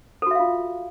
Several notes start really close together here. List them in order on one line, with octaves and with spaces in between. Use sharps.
A4 F#4 E5 F5 F4